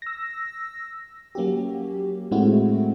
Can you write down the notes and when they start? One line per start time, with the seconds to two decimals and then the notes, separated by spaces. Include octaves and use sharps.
0.02 E6 A#6
1.35 F#3 A#3 C#4 F#4 G4
2.31 A2 G#3 A3 C4 E4 F#4